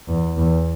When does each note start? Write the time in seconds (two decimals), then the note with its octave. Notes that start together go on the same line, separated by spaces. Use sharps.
0.08 E2
0.37 E2